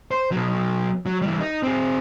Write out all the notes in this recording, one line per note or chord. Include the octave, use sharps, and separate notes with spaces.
C5
B2 F#3
F#3
E3 G3
D#4
C4 G#4